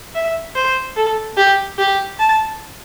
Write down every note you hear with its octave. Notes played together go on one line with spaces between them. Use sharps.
E5
C5
A4
G4
G4
A5